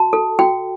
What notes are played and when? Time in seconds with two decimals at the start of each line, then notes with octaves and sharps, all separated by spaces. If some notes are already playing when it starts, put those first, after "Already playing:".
Already playing: F#4 A5
0.13 A4
0.39 F#4 G5